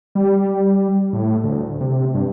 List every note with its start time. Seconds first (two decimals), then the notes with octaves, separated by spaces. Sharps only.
0.15 G3
1.13 A2
1.44 D2
1.81 C3
2.14 G2